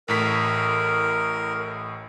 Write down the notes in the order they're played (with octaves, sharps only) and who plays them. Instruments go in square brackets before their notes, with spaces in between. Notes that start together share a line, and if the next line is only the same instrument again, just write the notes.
[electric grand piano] A1 A2 B6 [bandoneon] A#4